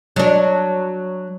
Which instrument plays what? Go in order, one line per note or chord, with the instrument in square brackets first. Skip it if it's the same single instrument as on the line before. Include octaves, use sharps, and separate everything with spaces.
[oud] F#3 D4